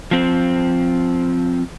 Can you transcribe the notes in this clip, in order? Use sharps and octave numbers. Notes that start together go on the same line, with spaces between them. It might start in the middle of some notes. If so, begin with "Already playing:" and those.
F3 C4